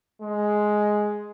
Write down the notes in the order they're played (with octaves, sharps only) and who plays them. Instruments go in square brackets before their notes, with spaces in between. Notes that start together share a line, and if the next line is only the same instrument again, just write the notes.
[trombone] G#3